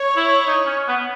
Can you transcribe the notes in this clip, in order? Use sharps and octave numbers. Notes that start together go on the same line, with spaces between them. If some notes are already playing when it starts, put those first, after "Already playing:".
Already playing: C#5
E4
D#4
C#4
B3